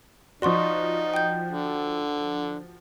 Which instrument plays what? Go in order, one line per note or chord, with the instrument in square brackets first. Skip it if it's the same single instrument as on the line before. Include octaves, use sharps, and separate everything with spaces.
[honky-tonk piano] F3 F#4 [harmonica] D#4 [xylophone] D5 C6 C#6
[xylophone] G5 G6
[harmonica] D3